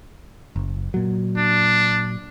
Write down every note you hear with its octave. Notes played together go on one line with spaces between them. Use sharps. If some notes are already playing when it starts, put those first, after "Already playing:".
F#1
A#2 F#3
D4